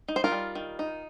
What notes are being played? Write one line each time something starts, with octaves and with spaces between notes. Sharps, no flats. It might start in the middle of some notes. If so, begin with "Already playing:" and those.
D#4
C5
F4 A#4
G3
D#3
D#4